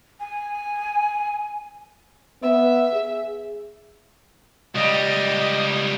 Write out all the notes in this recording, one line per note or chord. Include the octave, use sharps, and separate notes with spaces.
G#5
B3 E5
G#4
C#2 G3 D#5